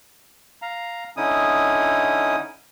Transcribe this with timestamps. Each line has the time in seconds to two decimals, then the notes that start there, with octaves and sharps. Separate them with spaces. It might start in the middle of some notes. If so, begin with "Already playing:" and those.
0.62 F5 A#5
1.17 D3 C#4 D#4 E4 D#6